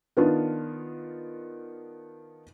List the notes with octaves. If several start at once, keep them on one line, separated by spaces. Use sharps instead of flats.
D#3 B3 D4 F4